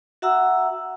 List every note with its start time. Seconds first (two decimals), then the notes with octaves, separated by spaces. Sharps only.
0.22 F#4 E5 F#5 A#5 E6